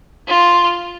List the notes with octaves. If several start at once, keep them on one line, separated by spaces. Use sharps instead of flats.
F4